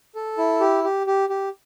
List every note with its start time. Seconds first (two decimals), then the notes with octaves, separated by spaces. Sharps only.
0.15 A4
0.38 E4
0.60 G4
0.84 G4
1.07 G4
1.29 G4